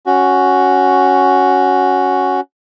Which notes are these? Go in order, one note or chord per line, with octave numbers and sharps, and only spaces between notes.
C#4 F#4